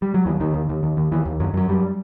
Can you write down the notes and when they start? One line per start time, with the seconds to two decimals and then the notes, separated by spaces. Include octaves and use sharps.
0.02 G3
0.14 F#3
0.26 D#2 E3
0.40 D#2 D#3
0.54 D#2
0.69 D#2
0.83 D#2
0.97 D#2
1.11 D#2 E3
1.26 D#2
1.40 F#2 F#3
1.54 F#2 F#3
1.69 F#2 G3